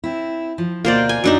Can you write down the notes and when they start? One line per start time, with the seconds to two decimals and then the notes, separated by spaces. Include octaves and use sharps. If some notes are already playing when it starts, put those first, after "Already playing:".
0.04 C4 E4
0.58 F3
0.85 D2 B2 A#3 F4 C5 D5
1.09 G#5
1.24 F#2 F#3 D4 D#4